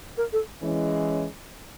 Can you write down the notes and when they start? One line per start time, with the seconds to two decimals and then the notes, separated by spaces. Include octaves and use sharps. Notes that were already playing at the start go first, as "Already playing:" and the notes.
0.17 A#4
0.32 A4
0.63 E3 G#3 C#4